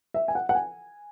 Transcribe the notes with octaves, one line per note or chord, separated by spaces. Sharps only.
E5
G#5
F#5
F#5
G#5